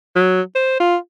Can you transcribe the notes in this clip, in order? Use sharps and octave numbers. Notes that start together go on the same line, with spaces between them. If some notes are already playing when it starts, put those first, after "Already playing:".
F#3
C5
F4